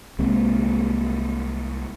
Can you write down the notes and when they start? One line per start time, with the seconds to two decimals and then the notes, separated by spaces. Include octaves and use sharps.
0.19 C2 G#3 A#3 C4